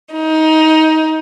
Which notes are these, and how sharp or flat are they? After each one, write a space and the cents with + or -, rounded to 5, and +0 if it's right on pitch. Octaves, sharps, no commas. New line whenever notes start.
D#4 +20